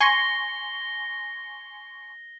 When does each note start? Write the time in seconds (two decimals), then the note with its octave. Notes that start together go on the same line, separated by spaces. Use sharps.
0.01 G#5 C6 C#6 A#6 G7